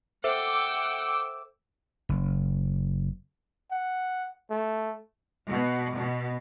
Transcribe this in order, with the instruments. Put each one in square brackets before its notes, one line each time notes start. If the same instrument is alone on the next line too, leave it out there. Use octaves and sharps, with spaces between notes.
[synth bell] A4 C5 E5 [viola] F#5 G5 [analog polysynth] D6 E6
[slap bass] F#1
[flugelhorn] F#5
A3
[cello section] B2
B2